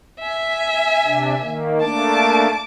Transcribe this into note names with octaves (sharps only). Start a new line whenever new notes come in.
E5 G#5
C3 D4
D#3 A#3
A3 A#3 D4 A5 D6